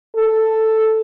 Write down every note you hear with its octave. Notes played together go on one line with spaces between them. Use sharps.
A4